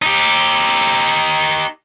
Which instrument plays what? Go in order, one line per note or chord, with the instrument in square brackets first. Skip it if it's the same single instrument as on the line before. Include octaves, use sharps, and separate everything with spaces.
[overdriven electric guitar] D#4 G4